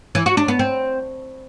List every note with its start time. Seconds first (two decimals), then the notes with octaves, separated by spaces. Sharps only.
0.15 E3
0.26 F#4
0.37 D4
0.48 B3
0.59 C4